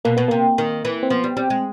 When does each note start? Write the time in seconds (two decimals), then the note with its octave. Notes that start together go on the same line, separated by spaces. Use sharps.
0.05 B2 A#3
0.17 B2 B3
0.28 C3 A#3
0.58 D#3
0.85 E3
1.03 C4
1.10 F3 B3
1.24 G3
1.37 G3 C4
1.50 G#3